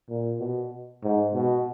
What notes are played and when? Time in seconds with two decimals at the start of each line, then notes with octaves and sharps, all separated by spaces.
0.09 A#2
0.40 B2
1.03 G#2
1.34 B2